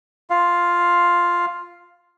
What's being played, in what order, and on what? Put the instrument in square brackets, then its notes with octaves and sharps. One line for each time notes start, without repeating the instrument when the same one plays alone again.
[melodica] F4 F5